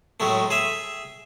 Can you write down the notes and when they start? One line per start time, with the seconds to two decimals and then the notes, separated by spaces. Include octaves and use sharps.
0.20 A2 F#3 G#3 A3
0.51 G#4 E5